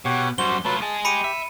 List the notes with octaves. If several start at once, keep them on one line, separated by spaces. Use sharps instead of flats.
B2 G4 C#5 F#5
F#2 G3 F#4 C5 G7
F#3 A3 F4 B4 A5
D#5 G#5 A5
G4 B5 C#7 D#7
E5